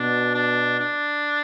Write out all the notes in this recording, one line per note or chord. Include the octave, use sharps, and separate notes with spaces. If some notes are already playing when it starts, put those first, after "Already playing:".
Already playing: B2 D4
D4
D4